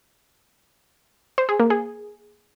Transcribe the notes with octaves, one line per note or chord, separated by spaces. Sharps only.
C5
G#4
A#3
G#4